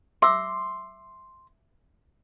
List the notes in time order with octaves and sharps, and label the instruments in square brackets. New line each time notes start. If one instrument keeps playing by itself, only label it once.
[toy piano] E5 D6 E6 [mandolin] C6